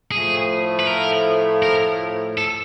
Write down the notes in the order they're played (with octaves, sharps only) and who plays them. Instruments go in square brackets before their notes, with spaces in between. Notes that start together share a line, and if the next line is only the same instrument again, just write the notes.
[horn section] A2 F3 A3 [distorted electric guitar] G#4
[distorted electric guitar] B4
A#4
A#4
A4